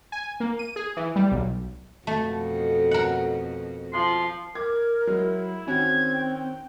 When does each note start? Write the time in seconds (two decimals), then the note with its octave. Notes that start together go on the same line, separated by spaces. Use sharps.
0.12 G#5
0.40 A#3
0.59 D#7
0.76 G#4
0.97 E3
1.16 G3
1.32 B1
2.07 F2 B2 A3 F#4
2.91 A#4 F#5
3.93 F3 C6
4.55 A#4 D6 G#6
5.07 F#3 G#3 E4
5.67 D#3 C4 C#4 F#4 G#6
6.14 G5